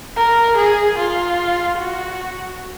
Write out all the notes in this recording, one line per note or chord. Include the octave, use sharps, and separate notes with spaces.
A#4
G#4
F4
F#4